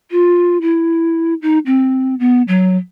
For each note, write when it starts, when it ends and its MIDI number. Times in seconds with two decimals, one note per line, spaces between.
0.11 0.58 65
0.61 1.34 64
1.42 1.59 63
1.66 2.15 60
2.19 2.42 59
2.48 2.77 54